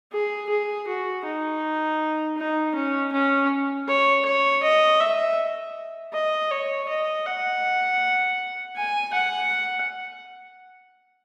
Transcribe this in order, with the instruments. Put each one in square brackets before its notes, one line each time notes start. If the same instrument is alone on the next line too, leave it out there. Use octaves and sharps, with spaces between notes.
[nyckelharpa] G#4
G#4
F#4
D#4
D#4
C#4
C#4
C#5
C#5
D#5
E5
D#5
C#5
D#5
F#5
G#5
F#5